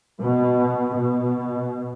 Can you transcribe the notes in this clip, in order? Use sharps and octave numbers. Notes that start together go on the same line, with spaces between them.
B2
B2